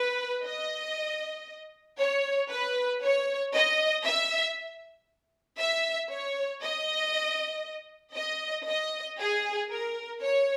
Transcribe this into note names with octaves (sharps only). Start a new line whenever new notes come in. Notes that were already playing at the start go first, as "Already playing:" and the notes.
Already playing: B4
D#5
C#5
B4
C#5
D#5
E5
E5
C#5
D#5
D#5
D#5
G#4
A#4
C#5